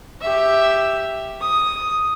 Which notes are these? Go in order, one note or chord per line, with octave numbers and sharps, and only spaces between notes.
G4 E5
D#6